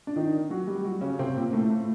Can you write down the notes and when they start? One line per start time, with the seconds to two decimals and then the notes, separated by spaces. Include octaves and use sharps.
0.07 D4
0.16 D#3 D#4
0.50 F#3 F#4
0.67 G3 G4
0.84 F#3 F#4
1.01 C#3 C#4
1.19 C3 C4
1.36 A#2 A#3
1.53 A2 A3
1.70 A2 A3